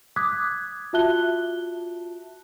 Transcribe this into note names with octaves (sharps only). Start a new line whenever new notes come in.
D6 D#6 F#6 G#6 B6
F4 F#4 E5 A5 F#6 G7